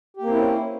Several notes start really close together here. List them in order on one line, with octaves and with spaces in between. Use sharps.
G4 A#3 C4 E4 C#4